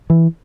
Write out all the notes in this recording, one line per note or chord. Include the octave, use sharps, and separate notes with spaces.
E3